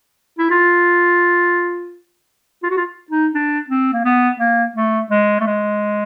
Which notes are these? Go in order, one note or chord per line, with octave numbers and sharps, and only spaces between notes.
E4
F4
F4
F#4
F4
D#4
D4
C4
A#3
B3
A#3
A3
G#3
A3
G#3